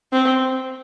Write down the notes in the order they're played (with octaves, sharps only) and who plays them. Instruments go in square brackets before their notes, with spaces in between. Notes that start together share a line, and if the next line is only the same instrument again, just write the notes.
[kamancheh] C4